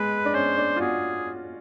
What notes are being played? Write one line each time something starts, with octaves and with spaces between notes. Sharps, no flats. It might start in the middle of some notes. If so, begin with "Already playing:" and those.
Already playing: G#3 B4
D4
C#4 C5
D4
F4
F#4 G#4